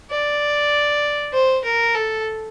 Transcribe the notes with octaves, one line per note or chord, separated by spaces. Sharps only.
D5
C5
A#4
A4